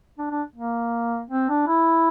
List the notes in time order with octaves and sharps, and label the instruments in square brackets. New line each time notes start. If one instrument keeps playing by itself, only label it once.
[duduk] D4
D4
A#3
C4
D4
E4